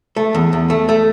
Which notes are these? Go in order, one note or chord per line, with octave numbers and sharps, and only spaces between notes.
A3
E2
E2
A3
A3